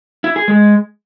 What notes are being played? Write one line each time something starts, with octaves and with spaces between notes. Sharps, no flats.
E4
G#4
G#3